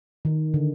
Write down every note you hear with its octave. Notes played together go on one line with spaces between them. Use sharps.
D#3
D3